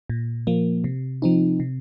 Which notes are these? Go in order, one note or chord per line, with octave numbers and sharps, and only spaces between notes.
A#2
F3 A#3
C3
F3 C4 D#4
C3